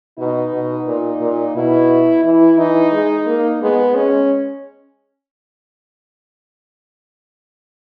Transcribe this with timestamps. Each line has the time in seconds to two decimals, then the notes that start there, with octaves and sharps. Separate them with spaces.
0.19 B2 D#4
0.53 B2
0.87 A#2
1.21 A#2
1.56 B2 E4
2.24 E3 E4
2.58 E3 D#4
2.92 G#3
3.27 A#3
3.62 G#3 B3
3.95 G#3 C#4